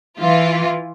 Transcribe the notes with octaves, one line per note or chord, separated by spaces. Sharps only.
E3 F4